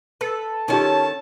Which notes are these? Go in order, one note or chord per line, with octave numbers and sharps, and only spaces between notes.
A4 B4
D#3 C#4 D#4 F4 G4 A5